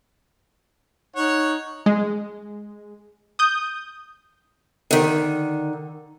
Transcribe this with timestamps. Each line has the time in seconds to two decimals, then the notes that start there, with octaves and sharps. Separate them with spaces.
1.16 D#4 C#5 F#5
1.86 G#3
3.39 D#6 G6
4.91 D3 D#3